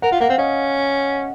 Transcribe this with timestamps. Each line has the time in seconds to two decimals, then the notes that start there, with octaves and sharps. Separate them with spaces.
0.02 A#4 F#5
0.11 F4 F5
0.20 A#3 F#5
0.29 C4 F5
0.38 C#4 D#5